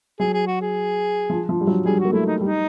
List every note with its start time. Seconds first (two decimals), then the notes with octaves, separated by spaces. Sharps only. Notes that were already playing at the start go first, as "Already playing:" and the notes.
0.20 F#3 G#4
0.34 G#4
0.47 F#4
0.61 G#4
1.30 F3
1.49 F3
1.61 G3
1.67 F#3
1.85 G3 G#4
2.00 F#4
2.05 A#3
2.12 A3 E4
2.26 D#4
2.41 G3 D#4